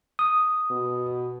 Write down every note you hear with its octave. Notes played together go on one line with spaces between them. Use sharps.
D#6
B2